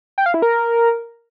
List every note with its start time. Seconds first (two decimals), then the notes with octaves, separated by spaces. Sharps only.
0.18 G5
0.26 F5
0.34 E4
0.42 A#4